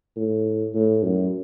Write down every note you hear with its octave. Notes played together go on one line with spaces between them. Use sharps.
A2
A2
F#2